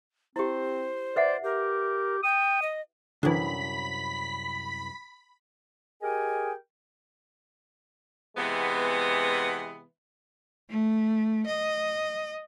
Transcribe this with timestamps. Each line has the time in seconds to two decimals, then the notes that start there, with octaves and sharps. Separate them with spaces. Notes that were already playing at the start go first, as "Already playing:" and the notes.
0.36 C4 E4 G4 C5
1.16 B4 D5 E5 F#5
1.44 G4 A#4
2.23 G5 D#6
2.62 D#5
3.23 C2 F#2 D3 E3 B5 B6
6.02 G4 G#4 A#4 D#5 G5 G#5
8.37 C3 E3 G#3 B3
10.70 A3
11.46 D#5